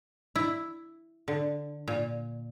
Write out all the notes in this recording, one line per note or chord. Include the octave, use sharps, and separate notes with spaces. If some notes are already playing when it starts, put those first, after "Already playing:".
E4
D3
A#2